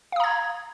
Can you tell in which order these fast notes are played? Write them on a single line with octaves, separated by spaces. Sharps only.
F5 D#6 A#5 G#6